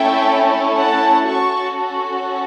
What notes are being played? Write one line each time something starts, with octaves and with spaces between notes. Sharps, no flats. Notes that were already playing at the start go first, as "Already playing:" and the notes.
Already playing: A3 C#4 E4 A4 E5 G5
F#5 A5
C#4 F#4 A4 A5 C#6